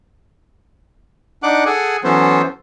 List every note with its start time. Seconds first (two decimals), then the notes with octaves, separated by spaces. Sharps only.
1.43 D4 D#4 F#5 D6 F#6
1.66 G#4 A4 F#5 G#5
2.04 E3 F#3 B3 C#4 A4 C5